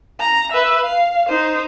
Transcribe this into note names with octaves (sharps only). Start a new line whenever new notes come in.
A#5
B4 E5
F5
D#4 C5